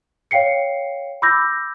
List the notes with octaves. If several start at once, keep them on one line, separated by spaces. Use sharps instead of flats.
C#5 F5 G5 C7 C#7
B5 D6 E6 G6 A#6